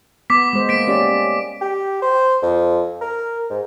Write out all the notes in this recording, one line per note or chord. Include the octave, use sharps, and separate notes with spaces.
B3 D6 B6
G#3 C5
A#3 B6 D7
C#4 G4 D5
G4
C5
F2
A#4
G#2